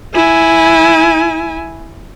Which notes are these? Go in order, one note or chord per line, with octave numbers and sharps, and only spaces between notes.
E4 G#5